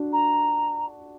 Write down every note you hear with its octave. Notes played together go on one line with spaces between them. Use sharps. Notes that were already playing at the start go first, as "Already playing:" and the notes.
Already playing: D4 F#4
A#5